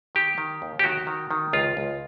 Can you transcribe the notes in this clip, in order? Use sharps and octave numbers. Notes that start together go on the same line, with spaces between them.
D#3 G4
D#3
D#2
G4
D#3 F#4
D#3
D#3
C#2 F4
C#2